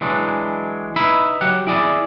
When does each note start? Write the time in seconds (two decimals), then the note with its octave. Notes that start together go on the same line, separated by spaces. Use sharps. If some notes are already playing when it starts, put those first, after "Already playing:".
0.01 E3 F#3 G#3 D4
0.96 D#4 B4 E5 B5
1.41 F#3 G4 F#5
1.67 E4 G#4 D5